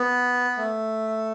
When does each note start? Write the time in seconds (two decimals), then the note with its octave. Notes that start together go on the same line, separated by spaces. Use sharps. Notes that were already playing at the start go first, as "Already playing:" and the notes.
Already playing: B3
0.57 A3